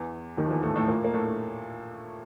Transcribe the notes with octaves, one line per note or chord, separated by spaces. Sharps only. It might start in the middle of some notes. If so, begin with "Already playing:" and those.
Already playing: E2 E3
D#2 D#3
F3
E2 E3
A2 A3
A2 A3
A#2 A#3
A#3
A2 A3